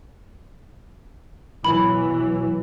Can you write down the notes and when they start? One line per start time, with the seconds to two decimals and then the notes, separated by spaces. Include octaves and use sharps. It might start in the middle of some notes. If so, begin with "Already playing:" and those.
1.65 B2 E3 F#3 B5